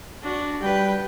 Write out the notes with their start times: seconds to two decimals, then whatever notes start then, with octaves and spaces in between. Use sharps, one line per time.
0.22 D4 F#4
0.62 G3 B4 G5